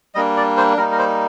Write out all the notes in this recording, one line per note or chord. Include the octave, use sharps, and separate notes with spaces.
G3 A#3 D4 D#5
D5
C5
G3 A#3 D#4 A#4
A#4
C5